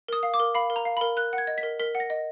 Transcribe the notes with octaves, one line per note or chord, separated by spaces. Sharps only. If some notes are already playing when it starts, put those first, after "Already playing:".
A#4 D#6
F5
D6
A#4
F5 B5
A#4
A#5
F5
A#4 B5
A#4 F#6
F#5
G#6
D#5
B6
A#4
A#4 B6
F#5
A#6
D#5